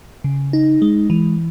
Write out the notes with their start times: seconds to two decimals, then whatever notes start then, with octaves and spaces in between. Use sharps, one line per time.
0.24 C#3
0.53 D#4
0.82 G#3
1.10 E3